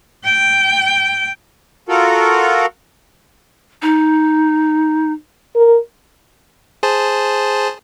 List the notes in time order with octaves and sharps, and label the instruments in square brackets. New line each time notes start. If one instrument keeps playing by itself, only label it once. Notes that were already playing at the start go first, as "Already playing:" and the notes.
[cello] G5
[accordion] F4 F#4 A4 A#4
[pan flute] D#4
[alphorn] A#4
[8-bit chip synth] G#4 C5 A5